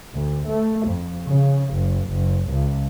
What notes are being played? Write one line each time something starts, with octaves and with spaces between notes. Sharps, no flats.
D2
A3
F2
C#3
F#1
F#1
C#2